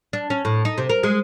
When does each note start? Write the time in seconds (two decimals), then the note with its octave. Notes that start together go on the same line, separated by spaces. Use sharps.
0.13 D4
0.30 C#4
0.45 A2
0.65 D#4
0.78 C3
0.89 A#4
1.03 G#3